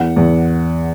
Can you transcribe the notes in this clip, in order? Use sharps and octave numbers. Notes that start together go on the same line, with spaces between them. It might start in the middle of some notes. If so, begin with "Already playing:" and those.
Already playing: E2 F#5
E2